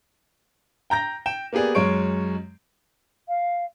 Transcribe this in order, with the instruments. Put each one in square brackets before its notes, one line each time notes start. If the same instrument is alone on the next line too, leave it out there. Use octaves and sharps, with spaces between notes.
[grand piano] G5 A#5 G6 A#6
G5 E7
A#3 B3 G4 G#4 D5
F#2 G#3 C#5 C#6 D7
[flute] F5